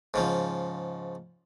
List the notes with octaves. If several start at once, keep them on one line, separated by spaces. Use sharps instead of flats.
G#2 C#3 F3